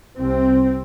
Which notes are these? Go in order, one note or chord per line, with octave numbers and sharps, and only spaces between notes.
C2 C3 C4